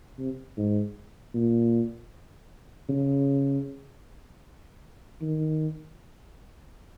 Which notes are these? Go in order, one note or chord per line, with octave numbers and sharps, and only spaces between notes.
C3
G#2
A#2
C#3
D#3